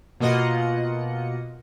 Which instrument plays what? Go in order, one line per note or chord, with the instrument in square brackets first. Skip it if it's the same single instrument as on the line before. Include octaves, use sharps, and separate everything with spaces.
[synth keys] B2 A#3 F4 D#5 F#5 C#7